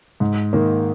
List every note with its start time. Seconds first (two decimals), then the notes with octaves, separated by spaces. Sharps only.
0.20 G#2
0.53 D#3 A#3